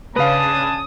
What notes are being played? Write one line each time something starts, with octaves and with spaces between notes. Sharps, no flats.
C#3 D4 B4 F5 G#5 A5 D#6